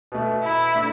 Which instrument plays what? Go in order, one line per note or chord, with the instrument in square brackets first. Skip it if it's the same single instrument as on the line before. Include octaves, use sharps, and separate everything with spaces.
[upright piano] B2 A3
[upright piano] B2 [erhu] E4
[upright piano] A3 D4